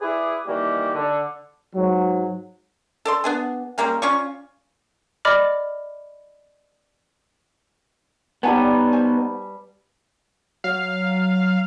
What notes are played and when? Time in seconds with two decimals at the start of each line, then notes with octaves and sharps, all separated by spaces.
0.01 E4 G#4 B4 D5
0.46 D#3 E3 G3 A#3 F#4 G4
0.94 D3
1.75 G#2 F#3
3.05 A4 D5 C6
3.24 B3 D4 G#4
3.78 G3 G#3 A#3 C#4
4.02 C#4 F4 D5 C#6
5.25 D5 D#5 B5 D6 F6
8.43 G3 B3 D#4 B4 C#5 F#5 G#5 A5
8.92 F#4 C5 G#5
10.64 F#3 F5